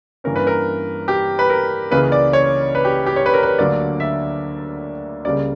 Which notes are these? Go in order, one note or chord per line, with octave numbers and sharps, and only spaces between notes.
G2 E3 A#3 C#4 A#4
B4
A#4
G4
B4
A#4
C#2 C#3 E3 A#3 B4
D5
C#5
B4
G4
G4
C#5
B4
A#4
B4
D2 D3 F#3 A#3 D5
E5
C#2 C#3 G3 A#3 D5